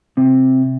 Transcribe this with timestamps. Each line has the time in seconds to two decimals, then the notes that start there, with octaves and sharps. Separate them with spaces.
0.17 C3 C4